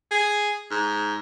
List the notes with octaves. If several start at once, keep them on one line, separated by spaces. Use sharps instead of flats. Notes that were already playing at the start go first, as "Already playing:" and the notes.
G#4
G#2